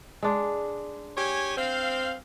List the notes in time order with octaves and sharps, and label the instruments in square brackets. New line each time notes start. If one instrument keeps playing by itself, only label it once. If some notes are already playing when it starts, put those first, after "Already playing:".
[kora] G#3 D4
[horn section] G4 C#5 G#5
C4 F5